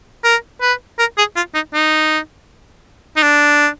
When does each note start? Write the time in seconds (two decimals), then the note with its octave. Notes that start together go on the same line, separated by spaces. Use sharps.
0.24 A#4
0.62 B4
0.99 A#4
1.18 G#4
1.36 F4
1.54 D#4
1.74 D#4
3.17 D#4
3.23 D4